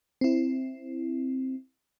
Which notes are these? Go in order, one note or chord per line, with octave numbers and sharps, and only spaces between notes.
C4 E4